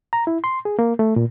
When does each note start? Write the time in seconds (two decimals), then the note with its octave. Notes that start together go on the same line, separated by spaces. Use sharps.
0.13 A#5
0.27 E4
0.44 C6
0.65 G#4
0.79 A#3
0.99 A3
1.16 A#2